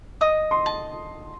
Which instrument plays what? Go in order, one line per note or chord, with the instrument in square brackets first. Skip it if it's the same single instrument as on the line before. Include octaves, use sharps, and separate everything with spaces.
[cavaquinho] D#5 [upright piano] D#6
[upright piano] C6
[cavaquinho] A5